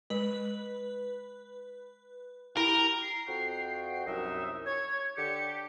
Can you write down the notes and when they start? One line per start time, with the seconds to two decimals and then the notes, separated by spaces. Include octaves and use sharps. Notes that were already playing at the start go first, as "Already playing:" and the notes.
0.10 G#3 B4
2.57 E4 G4 A#4
3.02 C7
3.28 F2 F#4 G5
3.93 C7
4.06 C2 F#2 D#4 E5
4.66 C#5 G#6
5.17 D3 G4 C#7